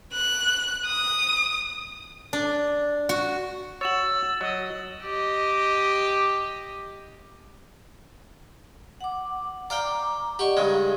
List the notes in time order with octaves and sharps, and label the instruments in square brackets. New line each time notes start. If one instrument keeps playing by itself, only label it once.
[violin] F#6
D#6
[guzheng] D4
F#4
[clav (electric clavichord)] F#4 C#5 [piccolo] E6 [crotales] A6 E7 F#7
[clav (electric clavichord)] F#3 [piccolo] D#5
[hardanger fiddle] G4 D#5
[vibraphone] F#5 D6
[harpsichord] D5 F5 G5 [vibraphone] A#5 D6
[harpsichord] G4 C#6 [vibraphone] D5 D#5 F#5
[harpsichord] G2 C#3 G#3 [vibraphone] G#4